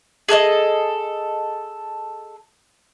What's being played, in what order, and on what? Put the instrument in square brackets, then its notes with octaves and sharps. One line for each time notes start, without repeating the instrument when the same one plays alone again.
[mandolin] G#4 A4 D5 D#5